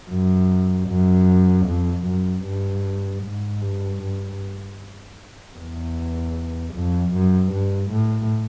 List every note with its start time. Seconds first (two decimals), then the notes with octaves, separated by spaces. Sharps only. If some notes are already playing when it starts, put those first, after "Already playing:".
0.11 F#2
0.89 F#2
1.67 F2
2.06 F#2
2.45 G2
3.23 G#2
3.62 G2
4.01 G2
5.58 E2
6.74 F2
7.14 F#2
7.52 G2
7.92 A2